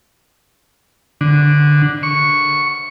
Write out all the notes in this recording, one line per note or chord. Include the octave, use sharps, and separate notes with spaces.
D3
C#6